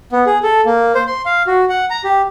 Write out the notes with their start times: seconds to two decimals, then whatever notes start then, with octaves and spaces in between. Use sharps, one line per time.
0.12 B3
0.26 G#4
0.43 A4
0.66 A#3
0.95 C5
1.07 C6
1.26 F5
1.47 F#4
1.69 F#5
1.90 A#5
2.04 G4